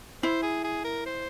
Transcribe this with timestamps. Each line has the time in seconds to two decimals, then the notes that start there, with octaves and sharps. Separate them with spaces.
0.23 E4 C5
0.43 G#4
0.64 G#4
0.84 A#4
1.06 C5